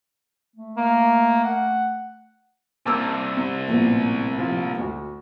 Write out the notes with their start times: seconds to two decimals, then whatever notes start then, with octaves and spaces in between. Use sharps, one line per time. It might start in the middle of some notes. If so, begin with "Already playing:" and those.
0.56 A3
0.77 A#3
1.44 F#5
2.86 C2 A#3 A5 D6 E6
3.37 C3
3.68 A#1 A2 B3
4.39 F3
4.78 D2 F#4